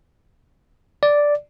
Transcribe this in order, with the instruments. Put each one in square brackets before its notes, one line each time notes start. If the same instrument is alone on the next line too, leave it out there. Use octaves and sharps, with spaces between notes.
[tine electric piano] D5